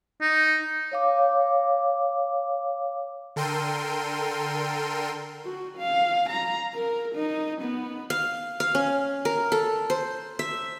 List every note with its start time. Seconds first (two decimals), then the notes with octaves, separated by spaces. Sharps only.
0.21 D#4
0.92 C#5 F5 D6
3.36 D3 A4 A#4 G5 C6 D#7
5.45 F#4
5.77 F5
6.29 A#5
6.74 A#4
7.15 D#4
7.61 B3
8.10 F5
8.60 F5
8.75 C#4
9.25 A#4
9.52 A4
9.90 C5
10.39 E5